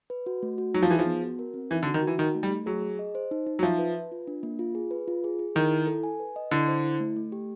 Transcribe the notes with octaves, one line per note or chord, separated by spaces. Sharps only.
B4
F#4
A3
F#4
F#3 D#4
F3
E3 G#4
F3
B3
F#4
A#4
C4
E3 D#4
D3
F#4
D#3
E3 F#4
D#3 D#4
A3
G3
A3
F#3 G#4
G#4
D#5
C5
D#4
D#4
F#3
F3 E5
B4
B4
F4
D4
A#3
F4
G#4
B4
F4
G#4
G#4
D#3 E4
E4
A4
G#5
B4
D#5
D3 E4
C5
E4
A3
A3
G4